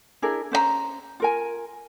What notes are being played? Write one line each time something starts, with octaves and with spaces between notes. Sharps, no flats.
D4 E4 G#4 A#4
C#4 C5 D#5 A#5
F4 A#4 G#5